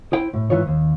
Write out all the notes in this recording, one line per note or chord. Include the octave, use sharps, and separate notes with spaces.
E4 C5 G5
A2
G#2 E3 F4 C#5
D#2